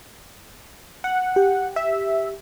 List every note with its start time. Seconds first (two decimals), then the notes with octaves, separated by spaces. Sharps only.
1.04 F#5
1.36 G4
1.76 E5